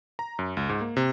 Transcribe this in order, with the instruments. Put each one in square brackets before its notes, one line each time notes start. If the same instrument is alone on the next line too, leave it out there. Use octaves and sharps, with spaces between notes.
[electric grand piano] A#5
F#2
C#2
G#2
A#3
C3